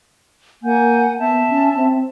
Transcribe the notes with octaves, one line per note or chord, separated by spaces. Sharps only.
A#3 F#5 G#5 G6
B3 E5 A5
C#4
C4